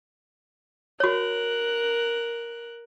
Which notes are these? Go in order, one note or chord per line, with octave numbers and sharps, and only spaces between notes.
F#4 A#4 C#5 F#6